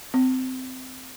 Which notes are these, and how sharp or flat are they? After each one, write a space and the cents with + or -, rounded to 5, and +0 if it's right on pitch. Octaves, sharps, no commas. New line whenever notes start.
C4 -20